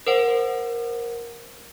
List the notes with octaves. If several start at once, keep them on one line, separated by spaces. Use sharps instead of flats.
A#4 C5 F#5